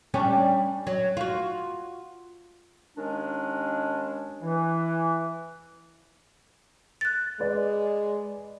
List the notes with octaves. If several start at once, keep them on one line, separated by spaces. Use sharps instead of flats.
G3 C#4 D4
F#3
F4 F#4
D#2 D#3 G#3 C#4 D4
E3
F#6 A6
G#3 B4 D5